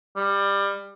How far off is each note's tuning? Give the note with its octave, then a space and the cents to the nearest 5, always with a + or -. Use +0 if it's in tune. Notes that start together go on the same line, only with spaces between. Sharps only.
G3 +20